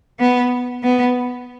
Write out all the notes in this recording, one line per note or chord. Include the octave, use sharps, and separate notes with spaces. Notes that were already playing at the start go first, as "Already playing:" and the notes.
B3
B3